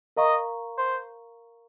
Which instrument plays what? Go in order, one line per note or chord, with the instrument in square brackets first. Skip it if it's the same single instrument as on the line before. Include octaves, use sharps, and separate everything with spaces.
[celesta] A#4 F5 A#5 C#6 [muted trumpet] D#5
[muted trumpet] C5